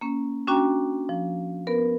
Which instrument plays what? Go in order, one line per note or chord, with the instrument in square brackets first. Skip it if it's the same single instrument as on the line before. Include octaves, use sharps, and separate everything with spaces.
[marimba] A#3 C#4
C#4 D4 F#4 G5 A#5
F3
B3 A#4 B4